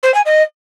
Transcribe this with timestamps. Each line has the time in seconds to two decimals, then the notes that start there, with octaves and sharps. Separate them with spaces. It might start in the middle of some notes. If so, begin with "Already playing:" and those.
0.03 C5
0.14 G#5
0.25 D#5